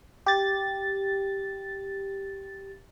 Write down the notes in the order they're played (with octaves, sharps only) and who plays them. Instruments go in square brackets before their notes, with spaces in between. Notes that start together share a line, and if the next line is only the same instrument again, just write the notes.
[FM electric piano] G4 A6